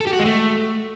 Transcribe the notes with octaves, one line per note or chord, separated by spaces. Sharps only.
A4
G4
F#4
G#3
A3